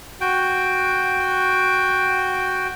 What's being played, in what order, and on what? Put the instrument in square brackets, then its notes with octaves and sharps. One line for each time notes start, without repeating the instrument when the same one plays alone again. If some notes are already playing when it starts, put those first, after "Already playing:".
[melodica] F#4 G5